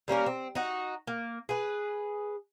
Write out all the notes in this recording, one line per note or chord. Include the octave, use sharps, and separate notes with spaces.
G3 A#3 C#4 A#4
C4
D#4 F#4
A#3
G#4 B4